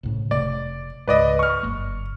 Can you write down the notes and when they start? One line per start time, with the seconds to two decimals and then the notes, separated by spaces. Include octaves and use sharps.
0.03 C2 A2 C#3
0.31 F1 C3 A3 D5
1.07 C#2 G#2 B4 D5 D#5
1.39 C#6 F6
1.63 F#1 G2 A#3